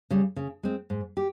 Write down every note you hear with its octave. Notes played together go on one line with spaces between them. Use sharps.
C#3 G3
C#3
G#3 C4
G#2
G4